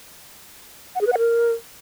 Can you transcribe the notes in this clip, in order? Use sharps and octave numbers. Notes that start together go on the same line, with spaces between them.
F#5
G#4
B4
F#5
A#4